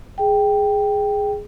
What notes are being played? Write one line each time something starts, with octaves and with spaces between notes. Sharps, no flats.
G#4 G5